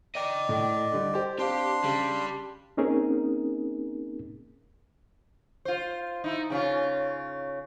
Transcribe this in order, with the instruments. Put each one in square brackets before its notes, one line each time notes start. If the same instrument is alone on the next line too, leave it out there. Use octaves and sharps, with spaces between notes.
[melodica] D5 [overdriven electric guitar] D#5 G5
[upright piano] A2
D3 G3
G4 C5
[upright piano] C4 F5 [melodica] D4 C6 [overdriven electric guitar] G4
[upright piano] C#3 [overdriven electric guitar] G3
[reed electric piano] A#3 C4 C#4 D#4 G#4 A#4
[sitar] F4 C5
D#4 E4
C#3 C#4 F4